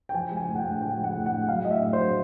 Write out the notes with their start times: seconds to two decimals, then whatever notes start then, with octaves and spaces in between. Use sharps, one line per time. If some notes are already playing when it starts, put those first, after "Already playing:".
0.09 G5
0.14 F3 G#5
0.31 G#3
0.37 G#5
0.48 A2
0.55 F#5
0.59 G5
0.65 A2
0.81 F3 G5
0.98 G#3
1.04 F#5
1.15 A2
1.26 F#5
1.32 A2
1.49 F#3 F5
1.65 A2 D#5
1.71 E5
1.82 A2
1.93 C5
1.99 F#3